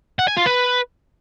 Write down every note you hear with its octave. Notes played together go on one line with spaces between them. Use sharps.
F#5
G#5
F4
B4